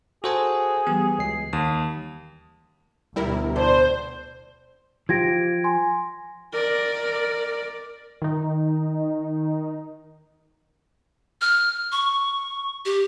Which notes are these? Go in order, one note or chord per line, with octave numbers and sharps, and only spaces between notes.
F#4 G#4 A4 C5 G#5
E3 G3 B3 G4
C#2 C7
D#2 D#6
D2 B2 G3 E4 A#4
A2 C5 D5
F3 F4 G4 G#6 A#6 D7
G#5 C6
A#4 D5
D#3 D#4
F6
C#6
G4